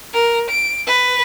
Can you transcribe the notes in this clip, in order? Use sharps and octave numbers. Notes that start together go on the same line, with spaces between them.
A#4
D7
B4